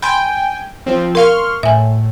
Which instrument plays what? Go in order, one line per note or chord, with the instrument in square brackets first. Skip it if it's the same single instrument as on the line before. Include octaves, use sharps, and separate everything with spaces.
[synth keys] G5 G#5 [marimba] B5 C6
[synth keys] F3 C4
[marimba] A#4 F5 [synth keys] C6 C#6 F6
[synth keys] A2 [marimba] E5 G#5